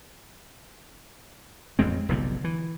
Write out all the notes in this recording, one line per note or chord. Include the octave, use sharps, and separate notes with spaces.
A1 F2 G#3 C4
F1 B1 G#2 D3
E3